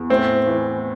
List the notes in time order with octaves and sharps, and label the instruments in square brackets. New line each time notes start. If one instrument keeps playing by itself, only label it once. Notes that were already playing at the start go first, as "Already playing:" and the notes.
Already playing: [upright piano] E2
[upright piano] A2 [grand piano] C4
[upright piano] E3